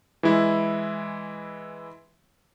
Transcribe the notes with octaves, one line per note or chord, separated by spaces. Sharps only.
E3 G#3 E4